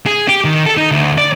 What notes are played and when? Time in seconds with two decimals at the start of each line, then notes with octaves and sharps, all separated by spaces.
0.06 G#4
0.29 G4
0.45 D#3
0.66 A4
0.77 D#4
0.91 D2
1.18 D5